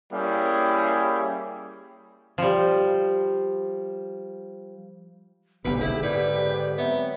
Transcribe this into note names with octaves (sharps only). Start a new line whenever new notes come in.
G3 A#3 C#4 E4 G4 G#4
F3 G3
F#1 B1 A#2 D3 G#3 B3 G4 B4
E4 G#4
G#2 B4 D5
F#3 B3 C4 C#5 E5